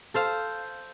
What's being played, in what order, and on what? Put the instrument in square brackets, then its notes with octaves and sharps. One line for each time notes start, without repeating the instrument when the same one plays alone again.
[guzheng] A4 C5 F5